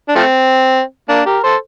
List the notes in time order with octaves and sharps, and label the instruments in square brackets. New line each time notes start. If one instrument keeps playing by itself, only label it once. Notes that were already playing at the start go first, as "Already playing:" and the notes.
[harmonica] D4
F3 A3 C4
A#3 D4
G4 A#4
A4 C5